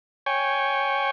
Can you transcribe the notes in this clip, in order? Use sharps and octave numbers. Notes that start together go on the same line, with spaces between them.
C#5 G5 G#5